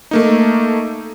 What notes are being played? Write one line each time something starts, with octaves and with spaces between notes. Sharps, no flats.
A3 A#3 D#4